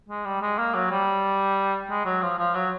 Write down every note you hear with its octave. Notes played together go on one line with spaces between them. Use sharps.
G#3
G3
G#3
A#3
F#3
G3
G#3
F#3
F3
F3
F#3